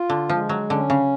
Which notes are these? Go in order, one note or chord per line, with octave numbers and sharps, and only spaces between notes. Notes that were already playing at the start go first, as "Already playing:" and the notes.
Already playing: F4
D3
F3 G#3
F#3
D3 C#4
C#3